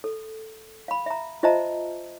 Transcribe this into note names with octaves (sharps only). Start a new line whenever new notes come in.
A4
F5 B5
E5 A#5
F4 C5 D#5 E5 A5 A#5